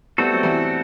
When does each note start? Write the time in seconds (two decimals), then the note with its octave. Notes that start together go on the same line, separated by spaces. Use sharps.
0.18 G3 A3 B3 C4 F#4 A4
0.33 F#3
0.43 E3 G3